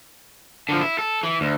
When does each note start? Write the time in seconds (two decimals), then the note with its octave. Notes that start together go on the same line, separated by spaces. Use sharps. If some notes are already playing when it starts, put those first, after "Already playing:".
0.69 D3 F3
0.81 E4
0.99 A4
1.23 E3
1.41 D2